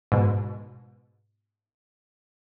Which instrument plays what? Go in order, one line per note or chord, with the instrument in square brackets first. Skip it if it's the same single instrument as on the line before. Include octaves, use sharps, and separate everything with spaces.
[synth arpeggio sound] G#2 B2